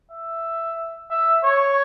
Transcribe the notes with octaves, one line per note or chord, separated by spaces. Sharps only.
E5
E5
C#5